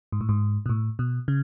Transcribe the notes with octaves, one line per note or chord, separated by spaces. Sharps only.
G#2
A2
G#2
B2
A2
B2
C#3